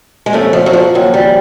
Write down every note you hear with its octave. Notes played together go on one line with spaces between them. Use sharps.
G#3
F2 C#3 F3 A3
F3
F#3
F3
D#2 C#3 F3 F#3
G3